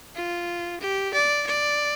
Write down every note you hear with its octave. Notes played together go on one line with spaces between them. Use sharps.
F4
G4
D5
D5